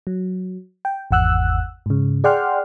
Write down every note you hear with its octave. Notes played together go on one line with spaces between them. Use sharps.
F#3
G5
G#1 E2 F#5 E6 F#6
G#2 C#3
G#4 D5 F#5 G5 C6 F6